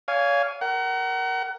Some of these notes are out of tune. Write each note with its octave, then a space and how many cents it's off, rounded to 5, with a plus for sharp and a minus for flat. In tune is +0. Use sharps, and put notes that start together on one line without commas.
C#5 +40 F5 -5 G#5 +0
A#4 +0 F#5 +35